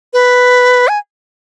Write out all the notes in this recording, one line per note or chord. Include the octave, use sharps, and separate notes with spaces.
B4
G#5